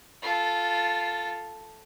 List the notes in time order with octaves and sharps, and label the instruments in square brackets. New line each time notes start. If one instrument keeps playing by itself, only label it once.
[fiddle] F4 A4